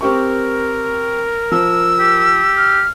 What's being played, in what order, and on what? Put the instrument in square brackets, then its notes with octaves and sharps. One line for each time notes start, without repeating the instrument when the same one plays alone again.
[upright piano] C4 G4 C#6 [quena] A#4
[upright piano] F3 [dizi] E6
[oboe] G4
[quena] F6